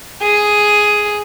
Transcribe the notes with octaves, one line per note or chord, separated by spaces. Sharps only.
G#4